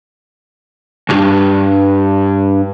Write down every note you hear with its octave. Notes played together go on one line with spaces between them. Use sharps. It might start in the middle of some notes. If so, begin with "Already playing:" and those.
B1 G2